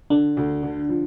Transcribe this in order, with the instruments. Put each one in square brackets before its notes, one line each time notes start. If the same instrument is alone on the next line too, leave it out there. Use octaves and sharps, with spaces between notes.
[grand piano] D3 [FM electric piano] D4
[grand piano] D2
D3
F3